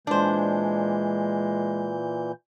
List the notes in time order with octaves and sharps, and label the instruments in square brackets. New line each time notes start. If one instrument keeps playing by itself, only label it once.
[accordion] A#2 E3 G6 [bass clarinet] G#3 [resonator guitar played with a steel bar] D4 C5